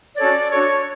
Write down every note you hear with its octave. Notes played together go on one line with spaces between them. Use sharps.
C#4 F#4 A4 C#5 D5
D4 F#4 A4 C#5